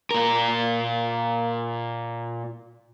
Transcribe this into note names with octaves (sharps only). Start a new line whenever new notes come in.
A#2 A#4